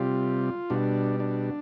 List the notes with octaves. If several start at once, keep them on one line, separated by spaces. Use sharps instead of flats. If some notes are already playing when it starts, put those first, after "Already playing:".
Already playing: C3 G3 F4
B2 G3 D4
D4